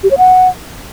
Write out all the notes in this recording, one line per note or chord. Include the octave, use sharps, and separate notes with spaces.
G4
C#5
F#5